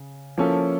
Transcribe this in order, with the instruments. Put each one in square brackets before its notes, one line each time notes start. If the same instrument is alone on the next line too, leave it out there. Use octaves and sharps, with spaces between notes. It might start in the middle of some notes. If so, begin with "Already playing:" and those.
Already playing: [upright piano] C#3
F3 A#3 C#4 E4 A4